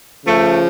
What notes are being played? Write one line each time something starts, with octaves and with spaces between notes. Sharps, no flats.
C#3 F3 A3